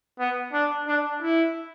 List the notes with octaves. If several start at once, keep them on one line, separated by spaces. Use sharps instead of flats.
B3
D4
D4
E4